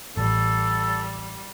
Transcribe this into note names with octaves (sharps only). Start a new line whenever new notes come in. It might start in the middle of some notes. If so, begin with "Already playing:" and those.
A1 G3 A4